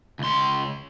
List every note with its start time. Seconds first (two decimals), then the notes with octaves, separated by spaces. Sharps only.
0.19 C#2 C6